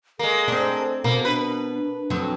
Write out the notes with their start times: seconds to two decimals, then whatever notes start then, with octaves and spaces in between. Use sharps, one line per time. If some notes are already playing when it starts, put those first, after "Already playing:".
0.19 G#3 A#3 A4
0.48 C4 D4
1.04 B2 A#3
1.25 D4 B4
2.10 F2 F#3